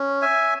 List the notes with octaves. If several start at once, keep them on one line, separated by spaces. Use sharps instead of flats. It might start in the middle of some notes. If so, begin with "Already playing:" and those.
Already playing: C#4
E5 G#5